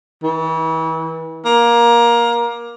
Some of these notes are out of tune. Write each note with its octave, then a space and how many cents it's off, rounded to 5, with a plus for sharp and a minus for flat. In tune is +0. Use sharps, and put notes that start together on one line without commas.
E3 -35
A#3 +20